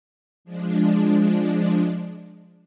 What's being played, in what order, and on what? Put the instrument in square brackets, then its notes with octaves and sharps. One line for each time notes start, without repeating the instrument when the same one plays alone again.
[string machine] F3 G#3 D4